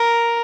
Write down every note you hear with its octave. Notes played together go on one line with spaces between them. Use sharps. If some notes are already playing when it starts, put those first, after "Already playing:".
Already playing: A#4